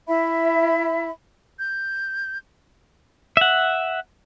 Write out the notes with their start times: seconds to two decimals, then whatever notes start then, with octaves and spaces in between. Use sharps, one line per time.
0.07 E4 E5 B5
1.59 G6
3.37 E5 F#5